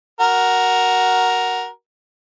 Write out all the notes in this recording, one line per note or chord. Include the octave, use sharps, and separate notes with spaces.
F#4 A#4